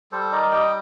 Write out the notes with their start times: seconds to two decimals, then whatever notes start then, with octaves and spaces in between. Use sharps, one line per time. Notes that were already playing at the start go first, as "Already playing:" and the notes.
0.12 G3 A4 C5
0.31 D#4 A#4 D5
0.52 G3 D#5 G5